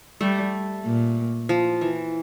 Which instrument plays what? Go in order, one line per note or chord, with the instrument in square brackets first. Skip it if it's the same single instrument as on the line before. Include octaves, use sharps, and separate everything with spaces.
[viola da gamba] G3 [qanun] A3
[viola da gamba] A#2
[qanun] F3
E3